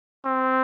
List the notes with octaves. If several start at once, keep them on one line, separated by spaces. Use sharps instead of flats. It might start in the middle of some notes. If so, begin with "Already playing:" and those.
C4